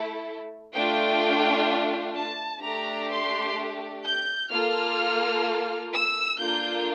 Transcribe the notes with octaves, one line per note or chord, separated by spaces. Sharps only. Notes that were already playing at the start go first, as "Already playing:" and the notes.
Already playing: A3 E4 A4
A3 D4 F4 G5
A5
A3 D4 G4 A#5
C6
G6
A#3 F4 A4 F6
E6
A#3 D4 F4 A4 G6